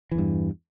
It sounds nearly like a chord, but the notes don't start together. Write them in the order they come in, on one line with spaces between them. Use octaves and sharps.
E3 E2 G2